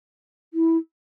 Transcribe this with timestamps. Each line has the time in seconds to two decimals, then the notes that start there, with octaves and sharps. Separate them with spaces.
0.54 E4